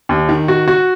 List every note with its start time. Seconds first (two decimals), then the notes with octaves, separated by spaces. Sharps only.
0.09 D#2
0.29 D#3
0.48 F#4
0.68 F#4